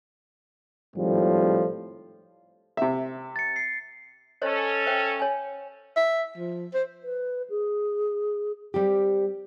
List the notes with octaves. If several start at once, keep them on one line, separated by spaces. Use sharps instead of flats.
G#1 F2 A2 F3 G3
C3 E5
A6 C#7
C7
C#4 A4 C5 C#5 D#5
C5 E5 G5
C#5 G#5
E5
F3
C5
B4
G#4
G3 C4 G4